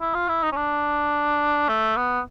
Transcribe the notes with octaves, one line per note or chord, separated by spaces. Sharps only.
E4
F4
E4
D#4
C#4
D4
A3
B3